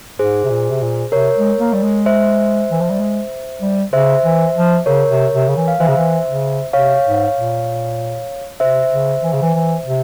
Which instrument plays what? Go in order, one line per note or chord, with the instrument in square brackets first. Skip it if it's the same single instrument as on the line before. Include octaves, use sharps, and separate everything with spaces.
[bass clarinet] G#2 [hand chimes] G#4 C5
[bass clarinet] C3
A#2
C3
A#2
[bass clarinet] C3 [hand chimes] A#4 C#5
[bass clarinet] G#3
A#3
G3
G#3
[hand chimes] C5 E5
[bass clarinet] E3
F3
G3
G#3
G3
[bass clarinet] C#3 [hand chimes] C5 E5
[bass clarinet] E3
F3
[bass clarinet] C#3 [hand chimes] A#4 C#5
[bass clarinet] C3
C3
C#3
E3
[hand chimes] F5
[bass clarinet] E3 [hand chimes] C5 E5
[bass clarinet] C#3
E3
C#3
[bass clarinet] C3 [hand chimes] C#5 F5
[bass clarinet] G#2
A#2
[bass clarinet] C3 [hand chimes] C5 E5
[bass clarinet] C#3
E3
C#3
E3
E3
C3